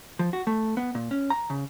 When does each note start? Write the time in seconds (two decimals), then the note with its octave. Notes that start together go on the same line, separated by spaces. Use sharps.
0.19 F3
0.33 F#4
0.47 A3
0.77 B3
0.95 A#2
1.11 C#4
1.30 A#5
1.50 C#3